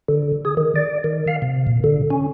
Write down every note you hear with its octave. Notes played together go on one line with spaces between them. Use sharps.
D3
G#4
D#3
D5
D#3
F5
C3
A#2
D3
C#4